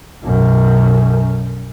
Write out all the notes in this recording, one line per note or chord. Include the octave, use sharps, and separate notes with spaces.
B1 F#2